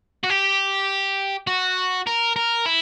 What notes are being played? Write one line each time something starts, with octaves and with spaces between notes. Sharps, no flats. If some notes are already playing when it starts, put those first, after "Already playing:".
F#4
G4
F#4
A#4
A#4
E4